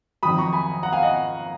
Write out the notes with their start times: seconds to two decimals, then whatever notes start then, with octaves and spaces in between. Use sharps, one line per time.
0.23 F2 D#3 F#3 B5 D#6
0.38 A#5 C#6
0.53 G#5 B5
0.83 F#5 A#5
0.93 F5 G#5
1.03 D#5 F#5